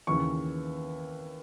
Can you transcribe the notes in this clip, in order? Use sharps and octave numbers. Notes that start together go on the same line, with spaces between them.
D#2 C#3 E3 C#6